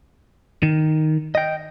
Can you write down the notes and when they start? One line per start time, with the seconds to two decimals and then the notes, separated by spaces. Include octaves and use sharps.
0.63 D#3
1.35 D#5 G5